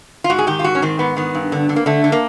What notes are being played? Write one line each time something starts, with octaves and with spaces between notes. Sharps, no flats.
F4
G#2 F#4
G#4
D#3 G4
F4
G#2 F#4
C#4
D#3 C4
G#2 B3
D#3 B3
G2
D3
D3
A#3
D3 A3
D3
A#3